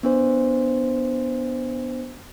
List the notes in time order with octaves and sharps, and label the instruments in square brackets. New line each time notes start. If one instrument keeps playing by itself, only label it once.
[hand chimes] B3 D4 C5